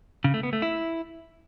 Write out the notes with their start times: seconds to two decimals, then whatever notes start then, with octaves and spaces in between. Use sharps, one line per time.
0.24 C#3
0.34 A3
0.43 B3
0.53 A3
0.62 E4